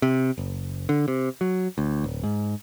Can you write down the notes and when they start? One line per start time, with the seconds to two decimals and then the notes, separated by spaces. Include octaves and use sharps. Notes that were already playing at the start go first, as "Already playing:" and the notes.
0.02 C3
0.38 F#1
0.89 D3
1.08 C3
1.41 F#3
1.78 D2
2.04 D1
2.23 G#2